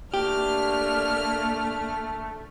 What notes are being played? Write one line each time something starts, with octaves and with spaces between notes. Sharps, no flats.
A3 A#3 D4 G4 F6